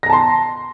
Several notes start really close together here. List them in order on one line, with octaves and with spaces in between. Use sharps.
A#6 A#5 A5 C6